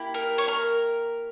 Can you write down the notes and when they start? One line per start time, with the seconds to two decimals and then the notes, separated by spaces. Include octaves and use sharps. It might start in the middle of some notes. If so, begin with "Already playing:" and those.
Already playing: A#3 E4 G4
0.14 A#4
0.38 C#5
0.48 A#4